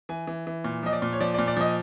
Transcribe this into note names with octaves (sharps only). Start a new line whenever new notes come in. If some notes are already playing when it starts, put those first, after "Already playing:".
E3 G#5
E3
E3
A#2
F3 D#5
D5
A#2
C#5
F3 D5
A#2 D5
D5
F3 D#5